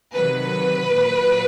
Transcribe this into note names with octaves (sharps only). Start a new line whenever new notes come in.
C3 D#3 F#3 B4
A#2 F#3